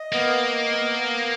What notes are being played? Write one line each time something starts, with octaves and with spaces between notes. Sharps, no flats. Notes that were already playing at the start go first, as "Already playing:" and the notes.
Already playing: D#5
A#3 B3
D#5
B3
B3